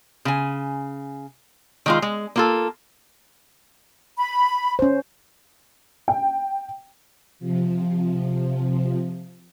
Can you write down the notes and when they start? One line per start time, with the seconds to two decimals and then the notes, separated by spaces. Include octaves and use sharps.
0.25 C#3 G#5
1.86 D#3 G#3 F4
2.02 G#3
2.36 A#3 F4 A4
4.17 B5
4.79 C#4 C5
6.08 G5
7.39 C3 F3